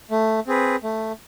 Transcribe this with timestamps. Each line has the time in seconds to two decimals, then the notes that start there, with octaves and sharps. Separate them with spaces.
0.11 A3
0.47 C4 G#4 B4
0.83 A3